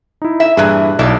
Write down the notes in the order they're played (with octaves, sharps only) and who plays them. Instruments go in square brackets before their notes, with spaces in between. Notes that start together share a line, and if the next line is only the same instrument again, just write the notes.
[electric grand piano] D#4 E4
[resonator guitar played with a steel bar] E5
[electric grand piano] G2 F#6 [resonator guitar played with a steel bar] A#2 E3 G#4
[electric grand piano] B1 [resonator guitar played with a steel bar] A3 E4 D5